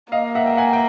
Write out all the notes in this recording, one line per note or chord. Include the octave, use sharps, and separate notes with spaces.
A#3 D#5 F5
E5 F#5
G5
F#5 G#5
G5